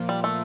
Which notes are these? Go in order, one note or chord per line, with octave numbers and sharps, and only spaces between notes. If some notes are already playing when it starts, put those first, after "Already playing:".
Already playing: A#2 F3 A#3 F4
G3
A3